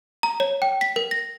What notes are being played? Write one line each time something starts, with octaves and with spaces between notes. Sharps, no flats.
A#5
C#5
G5
B6
A#4
A#6